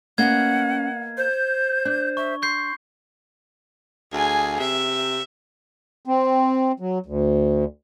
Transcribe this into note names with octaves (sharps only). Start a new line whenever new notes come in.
A#3 B3 C#4 D#5 F#5 G#6
C5 G6
D4
E5 C#6
C6 C#6 G6 C7
D2 G#4 G#5
C3 E5
C4
F#3
D2